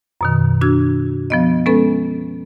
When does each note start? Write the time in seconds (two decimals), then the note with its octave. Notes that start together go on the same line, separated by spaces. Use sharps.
0.21 F#2 B2 D#3
0.61 D4 F#4 E6 G#6
1.30 F3 B3 D#5
1.66 G#3 B3 C#4 A4 B4